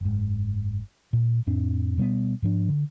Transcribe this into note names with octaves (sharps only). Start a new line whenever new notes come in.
F#1 G#2
A#2
F2 A2 C4 D4
B2 G3 A#3 B3
G#2 F3 D4
D3